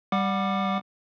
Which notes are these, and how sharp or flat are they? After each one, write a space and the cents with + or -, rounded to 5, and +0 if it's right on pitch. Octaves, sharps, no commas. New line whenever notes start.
G3 +0 F#5 -10 D6 +20